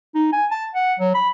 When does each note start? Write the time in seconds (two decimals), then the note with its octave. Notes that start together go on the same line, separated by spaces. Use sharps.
0.15 D#4
0.33 G#5
0.51 A5
0.75 F#5
0.99 F#3
1.14 B5